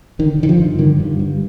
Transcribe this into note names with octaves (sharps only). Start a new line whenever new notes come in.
D3 D#3
D3 D#3
F3
G2
D3 D#3
G2
G2